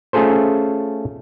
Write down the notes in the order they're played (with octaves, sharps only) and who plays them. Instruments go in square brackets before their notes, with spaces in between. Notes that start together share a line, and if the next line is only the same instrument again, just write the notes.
[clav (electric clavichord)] A3 C#4 F4 G#4 A4 C5